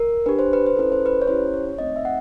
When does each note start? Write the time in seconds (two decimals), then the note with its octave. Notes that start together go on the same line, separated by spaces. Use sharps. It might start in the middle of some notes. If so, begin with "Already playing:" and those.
Already playing: A#4
0.26 D4 G4 B4
0.39 C5
0.53 B4
0.66 C5
0.76 C#4 E4 A4 B4
0.92 C5
1.06 B4
1.22 C#5
1.27 C#4 E4 G4 C5
1.54 C#5
1.78 A3 C4 D#4 D#5
1.96 E5
2.05 F#5